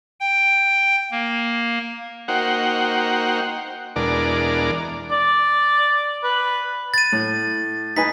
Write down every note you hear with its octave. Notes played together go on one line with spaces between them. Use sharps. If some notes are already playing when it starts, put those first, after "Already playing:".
G5
A#3
A#3 D#4 F#4 C5 F#5 G5
E2 B2 G#3 D4 A#4 D5
D5
B4
A6 D#7
A2
D#4 B4 G#5 B6